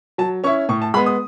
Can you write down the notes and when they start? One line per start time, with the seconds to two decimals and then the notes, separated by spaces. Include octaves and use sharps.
0.18 F#3 A5
0.44 C#4 E4 C#6
0.69 A2 C#6
0.82 A5
0.94 G#3 B5
0.97 B3
1.06 D#6